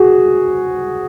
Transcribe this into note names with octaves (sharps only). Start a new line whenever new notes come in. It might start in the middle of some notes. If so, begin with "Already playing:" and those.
Already playing: F#4 G#4